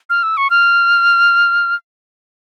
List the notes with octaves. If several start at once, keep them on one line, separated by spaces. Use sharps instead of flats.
F6
E6
C#6
F6